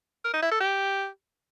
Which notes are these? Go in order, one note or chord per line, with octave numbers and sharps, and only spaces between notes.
A#4
D#4
E4
A4
G4